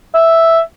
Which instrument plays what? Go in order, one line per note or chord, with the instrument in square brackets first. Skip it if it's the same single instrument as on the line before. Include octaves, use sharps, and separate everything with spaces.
[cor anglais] E5